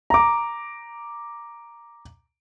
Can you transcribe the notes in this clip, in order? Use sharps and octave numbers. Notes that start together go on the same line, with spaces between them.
A#5 D6